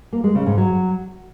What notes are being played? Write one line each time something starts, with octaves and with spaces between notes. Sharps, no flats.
A#3
G#3
C#3
G#2
F#3